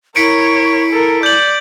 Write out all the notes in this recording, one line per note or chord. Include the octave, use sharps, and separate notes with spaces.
E4 A#4 C#5 B6 C#7 D7
A4 A#4
D5 G6 F#7